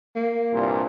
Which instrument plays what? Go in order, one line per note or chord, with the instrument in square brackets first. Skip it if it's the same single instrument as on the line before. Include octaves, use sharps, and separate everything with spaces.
[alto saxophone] A#3
[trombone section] C2 G2 A#2